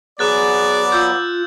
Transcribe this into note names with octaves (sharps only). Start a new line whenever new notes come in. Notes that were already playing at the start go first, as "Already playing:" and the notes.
F#3 B3 G#4 D5 D6 F#6 A6
F4 E6 G6